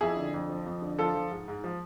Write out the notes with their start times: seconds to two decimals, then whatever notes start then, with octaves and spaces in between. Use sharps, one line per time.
0.01 F2 E4 G#4
0.17 D3
0.34 F2
0.50 F3
0.66 F2
0.82 D3
0.98 F3 F4 A4
1.15 F3
1.31 G#2
1.48 G#2
1.64 F3